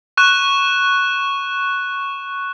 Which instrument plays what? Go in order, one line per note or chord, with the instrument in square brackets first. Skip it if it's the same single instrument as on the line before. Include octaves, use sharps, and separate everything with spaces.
[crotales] C#6 F#6 E7